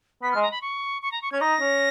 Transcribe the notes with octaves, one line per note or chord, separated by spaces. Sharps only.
B3 B6
G#3 F6
A#5
B5
C#6
C#6
A#5
C#6
C#4 G#6
D#4 A#6
C#4